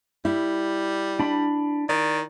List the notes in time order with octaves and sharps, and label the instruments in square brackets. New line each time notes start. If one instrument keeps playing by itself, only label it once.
[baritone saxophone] G3 [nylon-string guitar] E4
[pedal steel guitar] D4 B5
[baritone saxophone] D#3 [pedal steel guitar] D5